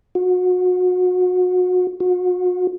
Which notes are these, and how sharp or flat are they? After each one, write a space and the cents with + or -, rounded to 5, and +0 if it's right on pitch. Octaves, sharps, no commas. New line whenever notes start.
F#4 -30
F#4 -40